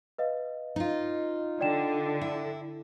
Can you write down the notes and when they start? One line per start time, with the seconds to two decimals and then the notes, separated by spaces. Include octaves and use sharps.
0.18 B4 D#5 F5
0.76 D#4 F4
1.61 D3 D5 G5 E7
2.21 E4